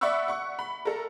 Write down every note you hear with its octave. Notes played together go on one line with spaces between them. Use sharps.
D5 E5 F#5 B5 C#6 E6
F#5 C#6
B5
A4 A#4